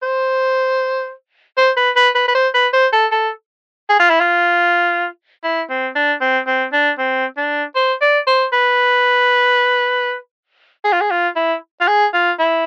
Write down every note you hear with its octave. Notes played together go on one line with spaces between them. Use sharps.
C5
C5
B4
B4
B4
B4
C5
B4
C5
A4
A4
G#4
F4
E4
F4
E4
C4
D4
C4
C4
D4
C4
D4
C5
D5
C5
B4
G#4
F4
G#4
F4
E4
F4
G#4
F4
E4